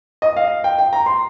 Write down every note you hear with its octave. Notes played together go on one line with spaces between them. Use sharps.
D#5
F5
G5
G5
A#5
C6